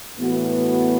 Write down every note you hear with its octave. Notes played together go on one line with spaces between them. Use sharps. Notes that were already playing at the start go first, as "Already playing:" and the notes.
A2 E3 B3 F#4